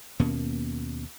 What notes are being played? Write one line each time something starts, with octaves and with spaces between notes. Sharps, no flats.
D#2 B2 A#3 C#4